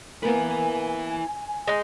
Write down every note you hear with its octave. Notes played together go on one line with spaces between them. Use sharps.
A#3 B3 E4 A#4 B4 G#5
G#3 D#4